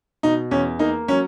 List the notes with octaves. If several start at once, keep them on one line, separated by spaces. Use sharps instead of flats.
B2 D#4
E2 C#4
A#3 D#4
F#3 C#4